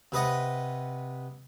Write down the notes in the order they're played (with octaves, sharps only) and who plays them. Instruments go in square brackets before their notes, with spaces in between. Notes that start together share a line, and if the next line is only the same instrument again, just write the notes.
[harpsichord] C3 B4 D#5 F#5